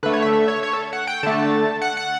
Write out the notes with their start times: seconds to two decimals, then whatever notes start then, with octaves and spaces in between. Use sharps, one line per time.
0.03 D3 A3 B4
0.13 C#5
0.22 E5
0.33 E5
0.48 C#5
0.63 C#5
0.73 A4
0.93 F#5
1.07 G5
1.23 D3 A3 A5
1.82 F#5
1.97 F#5